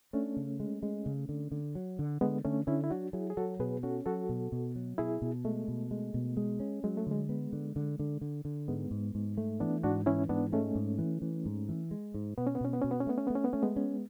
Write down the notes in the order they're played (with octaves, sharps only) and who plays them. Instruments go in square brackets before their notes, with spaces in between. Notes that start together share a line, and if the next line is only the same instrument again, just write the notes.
[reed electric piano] A3 C#4 [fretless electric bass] D4
[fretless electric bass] C#3
G#3
G#3
C#3
D3
D3
F#3
D3
[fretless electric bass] D3 [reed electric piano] G#3 B3
[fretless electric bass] D3 [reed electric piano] A3 C#4
[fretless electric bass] D3 [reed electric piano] C#4 E4
[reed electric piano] E4
[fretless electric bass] F#3 [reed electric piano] D4 F#4
[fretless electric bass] F#3 [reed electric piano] E4 G#4
[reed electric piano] G#4
[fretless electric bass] F#3 [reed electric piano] F#4 A4
[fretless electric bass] B2 [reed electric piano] G#4 B4
[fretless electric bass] C#4 [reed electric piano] F#4 A4
[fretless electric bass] F#3 [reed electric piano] F#4 A4
[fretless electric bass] B2
B2
F#3
[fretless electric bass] B2 [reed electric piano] E4 G#4
[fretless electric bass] B2
[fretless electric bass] G#3 [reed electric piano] A3
[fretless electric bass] B2
G#3
B2
G#3
C#4
[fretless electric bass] F#3 [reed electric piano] G#3
[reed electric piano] A3
[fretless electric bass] D3 [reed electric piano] G#3
[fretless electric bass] B3
D3
D3
D3
D3
D3
[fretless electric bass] G#2 [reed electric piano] G#3 B3
[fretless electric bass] G#2
G#2
A3
[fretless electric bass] E3 [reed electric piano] B3 D4
[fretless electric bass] G#2 [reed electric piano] D4 F#4
[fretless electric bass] E3 [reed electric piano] C#4 E4
[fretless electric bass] G#2 [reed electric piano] B3 D4
[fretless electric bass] G#3 [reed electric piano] A3 C#4
[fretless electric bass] G#2
E3
E3
G#2
E3
G#3
G#2
[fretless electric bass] B2 [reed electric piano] B3
[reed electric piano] C#4
B3
[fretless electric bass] B2 [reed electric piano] C#4
[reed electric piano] B3
[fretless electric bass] B2 [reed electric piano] C#4
[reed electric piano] B3
C#4
[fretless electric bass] A3 [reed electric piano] B3
[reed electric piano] C#4
[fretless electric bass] A3 [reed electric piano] B3
[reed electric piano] C#4
B3
[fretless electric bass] A3 [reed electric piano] C#4
[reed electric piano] G#3 B3
[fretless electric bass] C#4